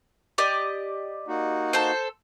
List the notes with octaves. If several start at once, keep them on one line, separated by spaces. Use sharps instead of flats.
G4 D5 D#5
A#3 D#4 F#4
A4 C5